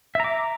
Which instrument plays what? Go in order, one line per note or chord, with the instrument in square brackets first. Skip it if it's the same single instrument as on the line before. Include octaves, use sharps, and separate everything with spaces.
[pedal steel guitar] E5
A#5
D6